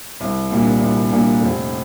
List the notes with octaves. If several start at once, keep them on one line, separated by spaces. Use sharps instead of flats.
C2
A#2 G3 A#3 D4
C2
A#2 G3 A#3 D4
F1